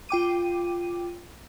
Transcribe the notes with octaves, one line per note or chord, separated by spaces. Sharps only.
F4 G5 D6 D#7